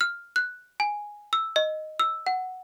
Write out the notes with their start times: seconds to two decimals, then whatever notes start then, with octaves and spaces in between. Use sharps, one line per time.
0.01 F6
0.36 F#6
0.80 G#5
1.33 E6
1.56 D#5
1.99 E6
2.26 F#5